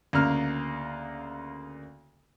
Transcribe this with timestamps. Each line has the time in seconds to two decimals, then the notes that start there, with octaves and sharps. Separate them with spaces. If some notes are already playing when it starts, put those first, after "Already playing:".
0.13 D2 C#3 A#3 F6